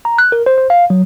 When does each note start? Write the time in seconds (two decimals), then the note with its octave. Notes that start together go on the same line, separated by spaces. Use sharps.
0.05 A#5
0.18 F#6
0.32 A#4
0.46 C5
0.58 C5
0.70 F5
0.90 F#3